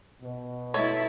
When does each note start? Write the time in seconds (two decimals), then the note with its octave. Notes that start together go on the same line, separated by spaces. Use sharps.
0.22 B2
0.74 A3 E4 C#5 D#5 E5 A5